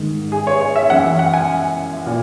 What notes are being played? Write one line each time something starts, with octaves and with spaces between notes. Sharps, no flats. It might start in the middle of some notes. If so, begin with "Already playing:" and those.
Already playing: G#2 D#3
G#4
C#5
C#5
E5
F#2 E3 F#5
E5
F#5
G#5
A#2